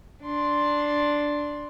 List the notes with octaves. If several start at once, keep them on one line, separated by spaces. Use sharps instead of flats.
D4 C6